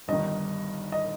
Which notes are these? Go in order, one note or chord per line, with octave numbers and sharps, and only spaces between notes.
G1 G2 D#3 D#5
D#5